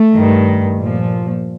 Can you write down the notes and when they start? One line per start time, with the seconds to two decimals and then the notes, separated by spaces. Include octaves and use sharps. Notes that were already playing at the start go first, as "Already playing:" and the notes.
Already playing: A3
0.13 G2 D#3
0.77 A#2 F3